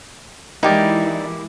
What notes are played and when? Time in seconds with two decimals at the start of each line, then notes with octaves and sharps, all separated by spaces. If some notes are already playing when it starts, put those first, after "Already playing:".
0.63 E3 G#3 A#3 D#4 E4 G4 D5